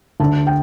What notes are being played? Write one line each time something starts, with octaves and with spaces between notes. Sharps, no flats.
D2 D3 A5
G5